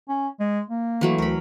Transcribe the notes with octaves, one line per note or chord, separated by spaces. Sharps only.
C#4
G#3
A#3
E3 F#3 A3
D2 A#4 B5